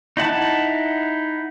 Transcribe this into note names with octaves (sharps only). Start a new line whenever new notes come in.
D#4 E4 F#5 A5